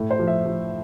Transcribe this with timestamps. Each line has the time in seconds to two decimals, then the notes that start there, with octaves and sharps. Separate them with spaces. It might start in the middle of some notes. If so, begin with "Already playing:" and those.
Already playing: A2
0.11 C5
0.19 F3
0.27 E5
0.45 F3